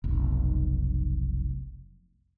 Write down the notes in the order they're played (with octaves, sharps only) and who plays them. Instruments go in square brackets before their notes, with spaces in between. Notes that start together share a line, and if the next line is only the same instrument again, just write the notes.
[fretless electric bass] F1 B1